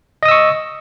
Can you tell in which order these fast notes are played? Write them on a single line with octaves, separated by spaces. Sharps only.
D#5 D#6 E6 C#6